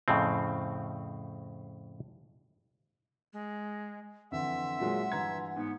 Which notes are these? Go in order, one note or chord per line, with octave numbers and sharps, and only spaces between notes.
F2 A2 C#3 C4
G#3
F2 D3 E3 E5 F#5 C6
A#2 F#3 G#3
G2 E3 A#5 G#6
G#2 B3